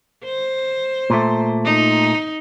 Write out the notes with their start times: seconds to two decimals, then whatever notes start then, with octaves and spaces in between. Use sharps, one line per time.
0.24 C5
1.10 A#2 A3
1.65 D#4